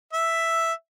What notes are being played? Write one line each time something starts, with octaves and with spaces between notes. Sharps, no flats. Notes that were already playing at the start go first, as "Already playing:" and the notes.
E5